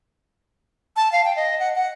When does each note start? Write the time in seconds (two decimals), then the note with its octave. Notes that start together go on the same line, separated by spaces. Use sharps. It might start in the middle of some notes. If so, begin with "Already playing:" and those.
0.96 A5
1.12 F5
1.25 G5
1.36 D#5
1.59 F#5
1.76 F#5